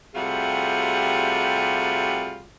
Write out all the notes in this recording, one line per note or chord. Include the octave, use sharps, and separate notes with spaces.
C3 G3 A3 F4 F#4 G#4